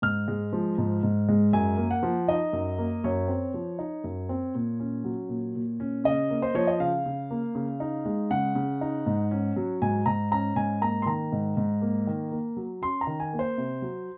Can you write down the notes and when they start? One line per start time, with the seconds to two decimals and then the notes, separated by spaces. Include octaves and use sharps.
0.02 G#2 F6
0.28 G#3
0.53 F3
0.78 G#2
1.03 G#2
1.29 G#3
1.53 F#2 G#5
1.78 A#3
1.91 F#5
2.03 F3
2.28 D#4 D#5
2.53 F#2
2.78 A#3
3.04 F#2 C#5
3.28 C4
3.54 F3
3.79 D#4
4.04 F#2
4.29 C4
4.55 A#2
4.80 C#4
5.04 F#3
5.29 A#2
5.55 A#2
5.80 C#4
6.04 C#3 D#5
6.30 A#3
6.42 C5
6.55 F3 C#5
6.67 D#5
6.79 C#3 F5
7.06 C#3
7.31 A#3
7.55 C#3
7.80 D#4
8.06 G#3
8.30 C#3 F#5
8.55 C#3
8.81 D#4
9.06 G#2
9.31 C#4
9.56 F#3
9.82 G#2 G#5
10.06 G#2 A#5
10.31 C#4 A#5
10.56 G#2 G#5
10.82 A#3 A#5
11.02 C6
11.06 D#3 A#5
11.32 G#2
11.57 G#2
11.82 A#3
12.07 D#3
12.32 A#3
12.57 F#3
12.82 C#4 C6
13.01 A#5
13.07 D#3
13.20 G#5
13.33 A#3
13.39 C5
13.57 C3
13.82 F#3